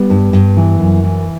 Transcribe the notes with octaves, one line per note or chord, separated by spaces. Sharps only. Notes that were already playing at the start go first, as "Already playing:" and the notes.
Already playing: G3 B3
G2
G2
E3
F#2
E3